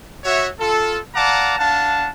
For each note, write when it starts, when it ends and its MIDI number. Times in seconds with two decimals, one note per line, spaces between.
0.24 0.48 66
0.24 0.48 73
0.24 0.48 76
0.60 0.98 65
0.60 0.98 69
1.14 1.58 74
1.14 1.58 77
1.14 1.58 78
1.14 1.58 81
1.14 1.58 82
1.14 1.58 86
1.59 2.08 62
1.59 2.08 77
1.59 2.08 78
1.59 2.08 81